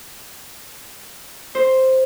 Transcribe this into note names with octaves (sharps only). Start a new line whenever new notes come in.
C5